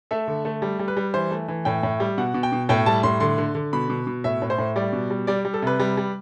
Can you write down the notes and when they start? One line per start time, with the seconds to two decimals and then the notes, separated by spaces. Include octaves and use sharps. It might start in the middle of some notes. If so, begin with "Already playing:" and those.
0.11 A3 E5
0.28 D3
0.45 A3
0.62 G3
0.79 G3
0.88 B4
0.97 G3
1.14 E3 C5
1.31 A3
1.48 E3
1.65 A2 G5
1.83 A2
2.00 G3
2.18 B2 F#5
2.34 B2
2.43 G5
2.52 B2
2.69 A2 G5
2.86 G3 A5
3.03 A2 C6
3.20 D3 C6
3.38 D3
3.55 D3
3.73 B2 B5
3.90 B2
4.07 B2
4.24 A2 E5
4.42 A2
4.50 C5
4.58 A2
4.76 G3 D5
4.93 B2
5.10 G3
5.27 G3 D5
5.45 G3
5.54 A4
5.62 C3 B4
5.80 G3
5.97 G3